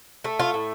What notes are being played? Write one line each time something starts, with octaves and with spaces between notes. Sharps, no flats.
A3
F4
A2